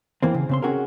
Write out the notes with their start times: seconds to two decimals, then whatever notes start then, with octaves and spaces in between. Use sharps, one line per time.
0.23 E2 E3 A#3 C4
0.34 C#3
0.49 C#3 C4 C6
0.62 C4 C#4 F#4 G#4 A#4